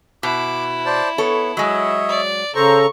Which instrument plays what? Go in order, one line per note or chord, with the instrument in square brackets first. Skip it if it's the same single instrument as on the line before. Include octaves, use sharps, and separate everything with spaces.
[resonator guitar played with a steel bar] B2 [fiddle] E4 [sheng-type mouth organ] D6
[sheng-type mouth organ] C5 D5 A5
[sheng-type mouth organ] B3 [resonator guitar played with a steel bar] A4 C#5
[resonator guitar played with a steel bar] F#3 G#3 [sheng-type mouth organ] C#5 D#5 E5
[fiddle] D5
[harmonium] C#3 A4 A#5 [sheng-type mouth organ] C5 [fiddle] C#6